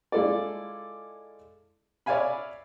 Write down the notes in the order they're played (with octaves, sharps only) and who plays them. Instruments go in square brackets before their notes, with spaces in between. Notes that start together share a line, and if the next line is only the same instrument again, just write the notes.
[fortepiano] G#3 E4 F4 A4 D5
C#5 D5 E5 F5 G#5 B5